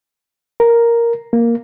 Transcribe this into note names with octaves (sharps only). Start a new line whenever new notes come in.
A#4
A#3